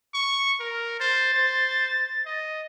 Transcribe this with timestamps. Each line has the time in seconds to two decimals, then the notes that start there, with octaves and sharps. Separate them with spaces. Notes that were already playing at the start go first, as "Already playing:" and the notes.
0.14 C#6
0.60 A#4
1.00 C5 A6
1.34 C5
2.26 D#5